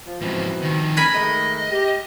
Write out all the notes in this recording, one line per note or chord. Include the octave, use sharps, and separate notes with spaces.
F3
G#2 B2 E3 F3 C4
D#3 F3
A#4 G#5 B5
D#3 G#3 A3 D#5
G4